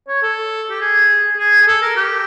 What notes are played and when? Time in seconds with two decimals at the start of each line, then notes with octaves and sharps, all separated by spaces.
0.08 C#5
0.22 A4
0.70 G4
0.81 G#4
1.38 G#4
1.62 G#4
1.67 A4
1.82 A#4
1.97 G4